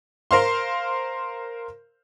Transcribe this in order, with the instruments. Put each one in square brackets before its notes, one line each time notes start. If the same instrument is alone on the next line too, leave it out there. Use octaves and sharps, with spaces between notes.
[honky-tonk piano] A#4 C5 F5 C6